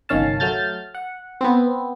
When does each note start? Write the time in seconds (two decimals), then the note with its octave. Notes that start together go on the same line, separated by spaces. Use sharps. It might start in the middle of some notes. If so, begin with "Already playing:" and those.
0.09 G1 C2 D#3 C#4 F5 A5
0.40 F#3 A3 F6 G6 A6
0.94 F#5
1.41 B3 C4